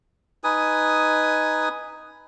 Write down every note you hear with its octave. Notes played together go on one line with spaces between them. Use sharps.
D#4 B4 G#5 D#6